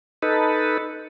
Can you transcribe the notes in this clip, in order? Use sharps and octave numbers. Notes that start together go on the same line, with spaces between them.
D#4 A4 B4